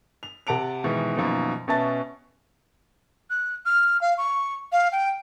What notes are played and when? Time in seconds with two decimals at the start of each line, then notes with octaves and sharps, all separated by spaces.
0.23 F7
0.47 C3 F#5 A5 D7 F7
0.84 G#2 B2 D#3 E3 G#3
1.17 F#2 B2 D#3 F3 A#3
1.68 B2 B3 C#4 E5 A5 A6
3.30 F#6
3.66 F6
4.01 F5
4.18 C#6
4.72 F5
4.92 G5